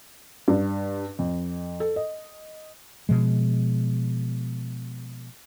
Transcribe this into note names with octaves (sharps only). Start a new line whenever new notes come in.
G2
F2
A4
D#5
B2 F3 G#3